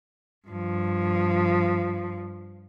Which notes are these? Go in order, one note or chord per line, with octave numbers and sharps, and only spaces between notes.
G2 F3